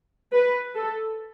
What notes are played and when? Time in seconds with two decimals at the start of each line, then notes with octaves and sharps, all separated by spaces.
0.32 B4
0.75 A4